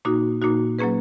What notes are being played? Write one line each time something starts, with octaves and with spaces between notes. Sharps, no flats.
A#2 A#3 D#4 F#4
A#2 A#3 D#4 F#4
F#3 A#3 C#4 G#4 B4